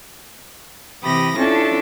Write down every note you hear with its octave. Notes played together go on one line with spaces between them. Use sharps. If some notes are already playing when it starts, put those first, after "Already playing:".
C3 E3 G4 B5 D#6 A#6
C#4 D4 E4 F4 A4